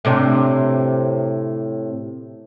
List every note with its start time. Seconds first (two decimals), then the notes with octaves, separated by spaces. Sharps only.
0.05 A2 C3 D4